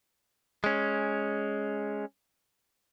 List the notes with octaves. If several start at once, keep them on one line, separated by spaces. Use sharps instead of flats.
G#3 C#4